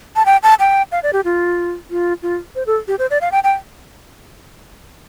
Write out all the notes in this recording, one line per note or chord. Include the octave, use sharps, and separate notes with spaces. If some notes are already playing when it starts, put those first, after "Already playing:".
A5
G5
A5
G5
F5
D5
G4
F4
F4
F4
C5
A4
G4
C5
D5
F5
G5
G5